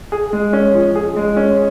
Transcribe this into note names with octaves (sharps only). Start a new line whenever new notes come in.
G#4
G#3
C#4
F3
G#4
G#3
C#4